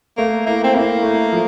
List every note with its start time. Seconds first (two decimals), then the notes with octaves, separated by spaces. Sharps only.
0.17 A3 A#3
0.46 A#3 E4
0.64 C4
0.75 A#3 E4
1.03 A3
1.32 F3